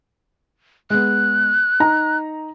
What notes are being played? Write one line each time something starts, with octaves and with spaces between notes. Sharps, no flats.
G#3 B3 F#6
D#4 A#5